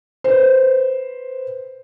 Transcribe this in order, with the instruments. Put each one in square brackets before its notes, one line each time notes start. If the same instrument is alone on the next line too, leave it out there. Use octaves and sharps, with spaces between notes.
[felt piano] B4 C5